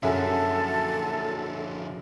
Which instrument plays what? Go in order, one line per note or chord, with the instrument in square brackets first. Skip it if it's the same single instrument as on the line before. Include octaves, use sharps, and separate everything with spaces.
[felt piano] F#2 [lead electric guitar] D3 F3 [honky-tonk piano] F#4 G#4 E5 [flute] A4